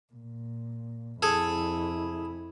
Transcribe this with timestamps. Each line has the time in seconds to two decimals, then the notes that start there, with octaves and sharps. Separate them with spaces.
0.14 A#2
1.22 F2 E4 G#4 A4